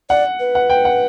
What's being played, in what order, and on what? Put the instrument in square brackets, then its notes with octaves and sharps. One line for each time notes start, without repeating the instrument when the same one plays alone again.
[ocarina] D5 [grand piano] F#5
[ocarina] B4
[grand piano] F#5
G5
F#5